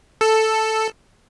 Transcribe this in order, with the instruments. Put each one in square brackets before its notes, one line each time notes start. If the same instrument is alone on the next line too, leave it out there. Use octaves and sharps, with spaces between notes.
[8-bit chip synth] A4